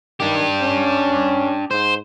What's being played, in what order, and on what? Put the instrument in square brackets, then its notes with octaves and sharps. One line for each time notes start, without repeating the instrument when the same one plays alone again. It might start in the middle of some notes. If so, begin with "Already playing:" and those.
[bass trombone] D#3 [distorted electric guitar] D4 G4
[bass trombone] C#4
[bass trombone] G#2 [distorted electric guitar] C5